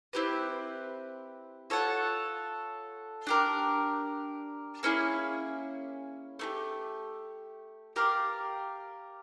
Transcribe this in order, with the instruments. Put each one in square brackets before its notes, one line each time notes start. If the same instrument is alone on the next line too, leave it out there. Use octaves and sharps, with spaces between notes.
[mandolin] C4 E4 G4 B4
F4 A4 C#5 F#5
D4 G4 A#4
A#3 C#4 E4 G#4
A3 D4 G4
G4 A#4 D5 F5